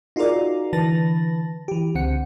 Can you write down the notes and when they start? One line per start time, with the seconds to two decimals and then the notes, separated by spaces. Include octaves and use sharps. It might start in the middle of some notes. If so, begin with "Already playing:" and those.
0.16 D#4 F4 F#4 G#4 A#4 D5
0.73 D3 E3 B4 A5 A6 A#6
1.68 E3 G4
1.95 C#2 D3 C4 F#5 C#7